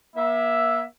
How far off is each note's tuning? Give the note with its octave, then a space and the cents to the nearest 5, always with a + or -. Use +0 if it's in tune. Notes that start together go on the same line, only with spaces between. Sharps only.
A#3 +40 E5 +0